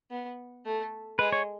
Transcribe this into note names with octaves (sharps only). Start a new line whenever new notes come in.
B3
A3
G#3 B4
C#5